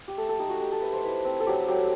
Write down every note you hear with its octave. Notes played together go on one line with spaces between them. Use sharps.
G4
A3 A4
A4
D#4 G4
F#4
D#4 G4
A4
A3 B4
C5
E4 B4
C4
A4
F#3 G4
F#3 G4